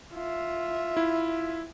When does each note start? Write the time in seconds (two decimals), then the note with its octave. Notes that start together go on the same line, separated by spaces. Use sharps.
0.14 F4 E5
0.97 E4